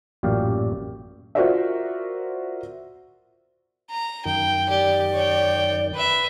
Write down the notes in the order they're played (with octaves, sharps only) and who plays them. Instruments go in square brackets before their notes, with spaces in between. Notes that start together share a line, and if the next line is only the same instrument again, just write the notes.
[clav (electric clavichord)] A1 F#2 A#2 G4 D5 F5
[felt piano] F4 F#4 A#4 C5 D5 E5
[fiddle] A#5
[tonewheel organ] F#2 D#3 [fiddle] G5
[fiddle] G4 [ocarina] D5
[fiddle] C#5 G5
B4 E5